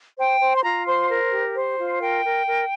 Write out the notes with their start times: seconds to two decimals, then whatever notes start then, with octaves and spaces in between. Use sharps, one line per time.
0.18 C5 G5
0.41 C5
0.56 C6
0.63 F4 A#5
0.86 C5 C6
1.09 A#4
1.32 G4
1.55 C5
1.78 F4
2.00 A#4 G5
2.23 A#4
2.46 A#4